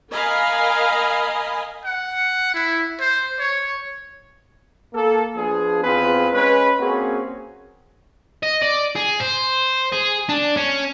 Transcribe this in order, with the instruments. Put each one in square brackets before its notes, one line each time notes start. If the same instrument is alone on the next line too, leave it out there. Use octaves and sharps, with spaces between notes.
[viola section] A#4 D#5 F5 G#5 B5
[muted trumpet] F#5
E4
C5
C#5
[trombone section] A#3 A4
F3 B3 D4 G#4
E2 C4 F4 G#4 B4
G#3 C#4 B4
A#3 C4 C#4 F#4 G#4
[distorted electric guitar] D#5
D5
G#4
C5
G#4
D4
C#4